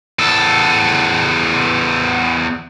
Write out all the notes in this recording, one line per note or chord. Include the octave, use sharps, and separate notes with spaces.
E2 A4